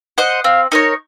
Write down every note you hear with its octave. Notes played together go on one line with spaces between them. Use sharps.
C5 D#5 F#5
C4 F5
D#4 A#4 C#5